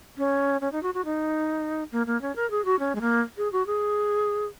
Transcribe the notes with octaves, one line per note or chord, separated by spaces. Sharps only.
C#4
C#4
D#4
F#4
F#4
D#4
A#3
A#3
C#4
A#4
G#4
F#4
C#4
G#3
A#3
G#4
F#4
G#4